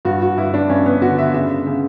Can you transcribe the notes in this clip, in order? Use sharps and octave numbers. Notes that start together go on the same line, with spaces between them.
G2 F#4
F#4
G2 E4
D4
G2 C#4
B3
D3 F#4
E5
C#3 E5
C#3